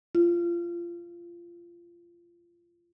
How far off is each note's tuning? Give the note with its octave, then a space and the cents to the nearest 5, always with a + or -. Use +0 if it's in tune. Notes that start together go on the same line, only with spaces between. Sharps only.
F4 -20